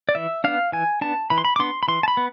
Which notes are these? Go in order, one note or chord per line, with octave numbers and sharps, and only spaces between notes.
D5
E3 E5
B3 D4 F5
E3 G#5
B3 D4 A5
E3 B5
C6
B5
D6
B3 D4 C6
B5
E3 C6
A5
B5
B3